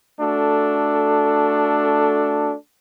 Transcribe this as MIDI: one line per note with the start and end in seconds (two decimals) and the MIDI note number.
0.21 2.54 57
0.21 2.54 62
0.21 2.54 66
0.21 2.54 69